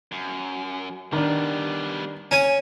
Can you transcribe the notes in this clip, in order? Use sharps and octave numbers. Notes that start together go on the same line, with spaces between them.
F#2
D#3 G3 B3 D4
C#4 G#5